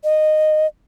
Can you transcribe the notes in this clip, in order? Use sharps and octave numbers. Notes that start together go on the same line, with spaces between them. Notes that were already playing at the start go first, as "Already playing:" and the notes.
D#5